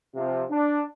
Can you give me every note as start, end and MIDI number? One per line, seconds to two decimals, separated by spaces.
0.15 0.43 48
0.15 0.43 53
0.50 0.82 62